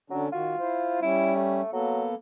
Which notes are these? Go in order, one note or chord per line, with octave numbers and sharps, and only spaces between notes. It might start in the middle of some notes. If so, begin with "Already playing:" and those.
D3 F#3 C#4 D4
D#3 F4 F#4
E4 C5
G3 C#4 E4
A3
F#3 A#3 B3 A4